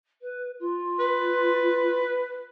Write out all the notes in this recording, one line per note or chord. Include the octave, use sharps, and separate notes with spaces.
B4
F4
B4